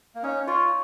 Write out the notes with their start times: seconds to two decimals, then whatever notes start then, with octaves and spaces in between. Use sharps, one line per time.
0.15 A#3
0.23 C#4 D#4
0.47 F4 C#5 F5